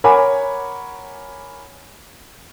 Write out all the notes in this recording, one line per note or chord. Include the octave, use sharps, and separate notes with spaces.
A#4 C#5 F#5 G#5 B5 D6